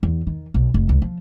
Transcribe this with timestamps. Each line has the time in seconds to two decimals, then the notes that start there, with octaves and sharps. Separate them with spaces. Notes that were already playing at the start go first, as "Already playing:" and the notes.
0.03 E2
0.27 D#3
0.54 B1
0.74 F1
0.89 C#2
1.02 F3